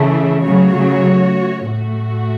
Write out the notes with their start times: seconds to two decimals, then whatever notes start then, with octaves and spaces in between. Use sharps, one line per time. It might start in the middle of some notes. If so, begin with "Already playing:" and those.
Already playing: C#3 E3 A3 E4
0.45 C#3 F#3 A3 F#4 C#5
0.76 C#3 F#3
1.69 A2 A3 F#4